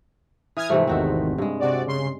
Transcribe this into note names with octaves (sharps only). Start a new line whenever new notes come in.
E3 D#6 F6 G#6
G#2 C3 E3 F3 A3
G#1 E2 D#3 C4 F#4 E5
G2 G#3
C3 F#4 D5
C#3 C6